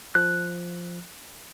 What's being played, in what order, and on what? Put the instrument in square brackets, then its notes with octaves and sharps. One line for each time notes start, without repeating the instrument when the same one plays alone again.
[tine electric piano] F3 [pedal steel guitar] F#6